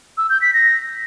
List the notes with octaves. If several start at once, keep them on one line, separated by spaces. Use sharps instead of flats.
E6
G6
B6
A#6